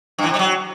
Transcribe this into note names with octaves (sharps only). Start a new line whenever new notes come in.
G2
E3
C3
G3
F#3